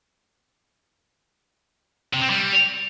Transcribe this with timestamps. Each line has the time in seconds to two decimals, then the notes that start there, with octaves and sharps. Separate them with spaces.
2.13 C3
2.22 C4
2.30 G3